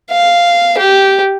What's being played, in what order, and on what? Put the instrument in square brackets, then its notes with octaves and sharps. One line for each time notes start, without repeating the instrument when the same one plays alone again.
[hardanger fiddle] F5
G4